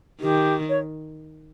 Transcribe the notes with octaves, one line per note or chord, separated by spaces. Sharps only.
D#3 G4
C#5